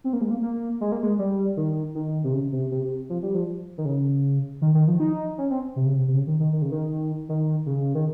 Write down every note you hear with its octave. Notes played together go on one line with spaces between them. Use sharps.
C4
A#3
G#3
A#3
A#3
G#3
A#3
G#3
G3
D#3
D#3
C3
C#3
C3
C3
C3
F3
G3
F3
D#3
C#3
D#3
D#3
F3
D#4
C#4
C4
C3
C#3
C3
C3
C#3
D#3
D#3
D#3
C#3
D#3
D#3
C#3
D#3